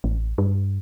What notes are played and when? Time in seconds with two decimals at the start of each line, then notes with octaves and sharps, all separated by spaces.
0.04 A1
0.38 G2